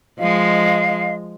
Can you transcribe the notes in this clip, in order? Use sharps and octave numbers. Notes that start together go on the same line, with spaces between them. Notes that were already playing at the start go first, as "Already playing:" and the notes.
F3 G#3 D#5 F5